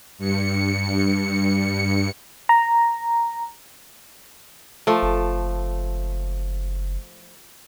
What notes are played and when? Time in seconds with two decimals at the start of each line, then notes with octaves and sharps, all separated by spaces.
0.18 G2 C#7
2.49 A#5
4.87 F3 A3
5.03 F#1